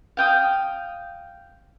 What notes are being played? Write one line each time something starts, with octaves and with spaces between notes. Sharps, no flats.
F5 G5 D#6